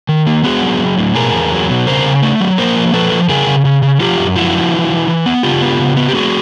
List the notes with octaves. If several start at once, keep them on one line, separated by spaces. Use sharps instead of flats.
D#3
A#3
B3 F#4 G#4
F#3
F#3
A2
B2 G#4 A#4
E2
F#3
B2
C#3 A#4 C5
C#3
A3
F#3
A#3 A#4 C5
F3
F3 A4 B4
F3
C#3 G#4 A#4
C#3
C#3
C#3
F3 F4 G4
F#2
F3 E4 F#4
F3
E3
E3
E3
B3
C#3 F4 G4
B3
C#3
B3
G4
A3 F#4 G#4